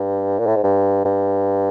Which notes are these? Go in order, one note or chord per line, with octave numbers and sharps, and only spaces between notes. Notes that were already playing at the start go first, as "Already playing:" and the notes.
Already playing: G2
A#2
A2
G#2
G2
G2